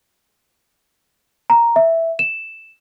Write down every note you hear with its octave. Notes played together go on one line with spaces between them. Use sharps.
A#5
E5
E7